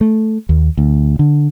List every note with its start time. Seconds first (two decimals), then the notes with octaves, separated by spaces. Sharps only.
0.01 A3
0.49 D#2
0.78 D2
1.19 D3